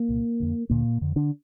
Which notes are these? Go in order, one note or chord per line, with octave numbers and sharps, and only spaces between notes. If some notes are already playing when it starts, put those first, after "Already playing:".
Already playing: A#3
C2 A#2
F2 D3
D2 A#2 D3 A#3
F2 D3
D3 D4